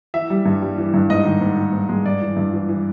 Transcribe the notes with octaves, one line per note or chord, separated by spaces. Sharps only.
E3 E5
G3
G2
G3
E3
G2
G#2 D#5
D#3
G#2
D#3
G#2
G#3
G2 D5
E3
G2
E3
E3